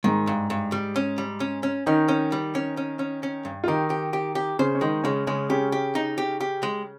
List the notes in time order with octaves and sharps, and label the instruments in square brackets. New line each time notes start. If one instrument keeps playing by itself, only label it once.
[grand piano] G#2 G#3 [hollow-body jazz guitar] D#3
[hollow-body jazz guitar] G2
G2
G3
C#4
G3
C#4
C#4
[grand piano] D#3 D#4 [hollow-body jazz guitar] C#4
[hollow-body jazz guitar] C#4
G3
C#4
C#4
C#4
C#4
G2
[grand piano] F4
[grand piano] D#3 D#4 [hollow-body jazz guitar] G4
[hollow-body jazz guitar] G4
G4
G4
[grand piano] C#3 C#4 [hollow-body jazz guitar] C5
[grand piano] C#4
[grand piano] D#3 D#4 [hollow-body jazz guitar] G#3
[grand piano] C#3 C#4 [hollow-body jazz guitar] G#3
[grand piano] C#3 C#4 [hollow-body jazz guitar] G#3
[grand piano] C#3 C#4 [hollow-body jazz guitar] G4
[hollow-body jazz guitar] G4
D#4
G4
G4
G#3